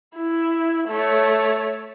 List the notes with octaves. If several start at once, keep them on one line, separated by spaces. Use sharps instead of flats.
E4
A3 C#5